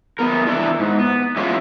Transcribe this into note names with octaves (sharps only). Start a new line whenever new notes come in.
E2 A#2 B3 A#4
E3 D4 E4
G#2
B3
E3 G#3 C#4 E4 F4